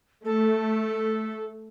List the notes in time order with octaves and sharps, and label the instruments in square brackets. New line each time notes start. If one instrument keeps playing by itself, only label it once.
[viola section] A3 [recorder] A4